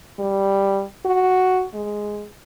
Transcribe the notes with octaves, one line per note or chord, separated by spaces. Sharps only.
G3
F#4
G#3